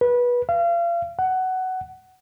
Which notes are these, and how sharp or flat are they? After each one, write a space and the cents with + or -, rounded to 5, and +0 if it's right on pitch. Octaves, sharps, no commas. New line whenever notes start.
B4 -20
F5 -35
F#5 +15